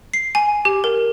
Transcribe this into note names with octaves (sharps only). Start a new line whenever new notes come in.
C7
G#5
G4
A#4